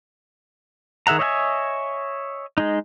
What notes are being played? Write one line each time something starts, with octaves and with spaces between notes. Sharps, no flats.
D#3 G#4 E5 F#5 A#5
C#5 D#5 E5 F#5 G#5
G#3 D#4